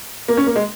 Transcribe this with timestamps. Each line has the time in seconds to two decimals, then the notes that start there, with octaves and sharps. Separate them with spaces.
0.28 A#3
0.37 C#4
0.47 A#3
0.56 G#3